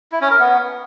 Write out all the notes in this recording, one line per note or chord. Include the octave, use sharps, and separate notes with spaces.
E4
C#4
A#4
B3